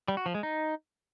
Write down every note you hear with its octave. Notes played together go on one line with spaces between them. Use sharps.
G3
F#4
F3
G#3
D#4